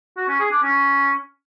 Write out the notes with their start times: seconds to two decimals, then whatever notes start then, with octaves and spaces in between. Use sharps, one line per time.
0.17 F#4
0.29 C#4
0.40 G#4
0.51 D4
0.63 C#4